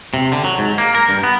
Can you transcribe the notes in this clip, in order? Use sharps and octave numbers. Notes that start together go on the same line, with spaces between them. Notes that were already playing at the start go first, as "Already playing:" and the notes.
C3
D3
F#3
G#2
A#3
A#4
G2
B3